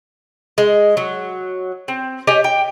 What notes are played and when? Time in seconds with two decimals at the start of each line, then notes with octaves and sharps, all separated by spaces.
0.58 G#3
0.97 F#3
1.88 C4
2.27 G4 C#5 D#5 G#5
2.44 G5